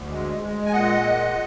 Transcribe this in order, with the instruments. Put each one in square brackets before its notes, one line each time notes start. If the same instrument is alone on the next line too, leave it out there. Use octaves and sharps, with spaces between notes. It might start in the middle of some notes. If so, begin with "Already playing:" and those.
Already playing: [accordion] D2
G#3
G#3
G#5
A#2 D#5 F#5
G#3